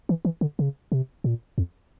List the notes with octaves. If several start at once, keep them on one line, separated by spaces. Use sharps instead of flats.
E3
E3
D3
C#3
C3
A#2
F2